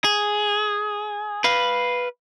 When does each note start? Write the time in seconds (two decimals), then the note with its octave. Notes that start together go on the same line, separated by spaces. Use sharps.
0.04 G#4
1.44 B4 F5